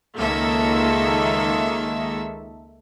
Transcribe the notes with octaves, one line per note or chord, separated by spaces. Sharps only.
C#2 D#3 G#3 A#3 A4 E5